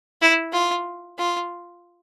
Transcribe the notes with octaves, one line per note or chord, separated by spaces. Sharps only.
E4
F4
F4